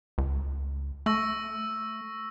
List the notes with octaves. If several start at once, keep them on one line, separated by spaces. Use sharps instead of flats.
C#2
A3 C#6 E6 A#6